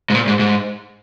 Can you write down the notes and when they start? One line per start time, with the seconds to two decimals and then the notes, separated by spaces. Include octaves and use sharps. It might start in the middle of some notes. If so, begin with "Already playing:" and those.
0.10 G#2
0.14 A#2
0.27 G#2
0.39 G#2